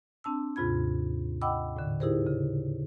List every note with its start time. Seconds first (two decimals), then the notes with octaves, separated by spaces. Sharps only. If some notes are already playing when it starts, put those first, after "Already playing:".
0.24 C4 D4 A5 E6
0.56 D#2 G#2 C3 F4 B5 G#6
1.42 D#5 F#5 G5 B5 D6 E6
1.77 A2 D3
2.00 D#4 E4 G4 G#4 A#4 C5
2.27 C#3